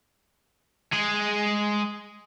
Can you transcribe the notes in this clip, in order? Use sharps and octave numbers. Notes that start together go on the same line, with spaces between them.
G#3 G#4